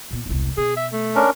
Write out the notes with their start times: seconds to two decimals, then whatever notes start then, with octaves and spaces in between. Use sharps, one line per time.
0.11 A#2 B3
0.26 E1 C2
0.57 B2 G#4
0.76 E5
0.92 A3
1.15 C#4 D4 A#4